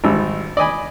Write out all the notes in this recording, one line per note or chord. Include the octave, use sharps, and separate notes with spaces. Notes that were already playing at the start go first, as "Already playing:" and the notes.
G#1 G3 E6
D5 D#5 G#5 B5